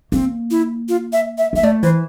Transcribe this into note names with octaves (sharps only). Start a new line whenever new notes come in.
A#3 C4
E4
F4
E5
E5
A#3 E5
A3 D5
E3 C5